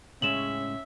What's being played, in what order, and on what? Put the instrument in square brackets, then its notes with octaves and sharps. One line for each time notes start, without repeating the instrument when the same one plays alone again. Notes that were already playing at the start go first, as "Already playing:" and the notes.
[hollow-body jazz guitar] A2 C#3 G#3 [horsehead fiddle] C#4 [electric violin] E5 [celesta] E7 F#7